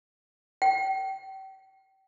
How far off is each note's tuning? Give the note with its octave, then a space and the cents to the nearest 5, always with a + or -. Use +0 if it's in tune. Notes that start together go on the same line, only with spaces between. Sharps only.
G5 -35